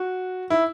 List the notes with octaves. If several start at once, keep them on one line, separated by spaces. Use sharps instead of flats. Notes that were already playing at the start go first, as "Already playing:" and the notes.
Already playing: F#4
E4